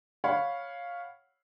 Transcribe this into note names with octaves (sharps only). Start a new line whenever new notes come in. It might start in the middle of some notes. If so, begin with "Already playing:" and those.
C#5 F5 F#5 B5